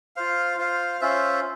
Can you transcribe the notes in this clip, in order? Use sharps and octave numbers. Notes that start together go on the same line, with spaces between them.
F4 C5 F5
F4 C5 F5
C#4 F4 C5 E5